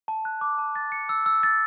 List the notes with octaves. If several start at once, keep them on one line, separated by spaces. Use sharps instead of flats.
A5
F#6
D6
A5
A6
C#7
E6
E6
A6